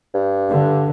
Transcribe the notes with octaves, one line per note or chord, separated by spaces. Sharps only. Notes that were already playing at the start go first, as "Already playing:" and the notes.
G2
D3